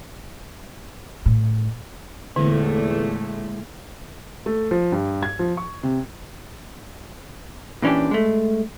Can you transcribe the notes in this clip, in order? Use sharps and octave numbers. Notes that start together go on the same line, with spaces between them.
A2
E2 A#2 D3 G#3 A3 E4
A3
F3
G2
G#6
F3
C#6
C3
A#2 E3 C#4 D4 G4
G#3 A3